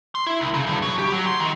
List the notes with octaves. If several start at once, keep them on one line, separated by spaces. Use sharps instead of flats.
C6
E4
C2
C#3
G2
F#3
G4
F#3
C6
D#3